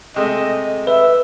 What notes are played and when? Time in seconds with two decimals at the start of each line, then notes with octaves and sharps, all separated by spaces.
0.16 C3 G#3 A3 D#5
0.87 B4 E5